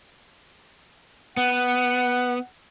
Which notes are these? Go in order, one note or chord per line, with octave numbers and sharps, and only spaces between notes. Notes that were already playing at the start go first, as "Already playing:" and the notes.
B3 F#5